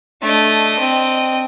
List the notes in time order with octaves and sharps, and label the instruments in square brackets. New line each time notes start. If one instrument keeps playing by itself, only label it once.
[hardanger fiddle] A3 [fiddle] D4 D#5
[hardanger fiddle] C4